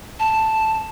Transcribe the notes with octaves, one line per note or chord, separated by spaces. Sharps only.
A5